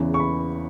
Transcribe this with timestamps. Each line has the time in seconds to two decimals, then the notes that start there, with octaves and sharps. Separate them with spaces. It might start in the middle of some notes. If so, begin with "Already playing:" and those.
Already playing: E2 C#3 E3
0.14 C#6
0.20 B5